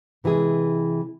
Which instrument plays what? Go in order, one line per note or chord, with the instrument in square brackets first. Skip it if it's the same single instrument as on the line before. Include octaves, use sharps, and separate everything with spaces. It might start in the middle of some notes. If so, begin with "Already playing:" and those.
[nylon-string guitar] C3 E3 G#3 G#4